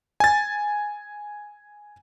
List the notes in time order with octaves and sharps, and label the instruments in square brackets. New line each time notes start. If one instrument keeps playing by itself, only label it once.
[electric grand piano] G#5 A6